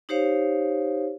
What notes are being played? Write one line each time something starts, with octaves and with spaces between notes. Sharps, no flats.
D#4 G4 C5 C#5 F5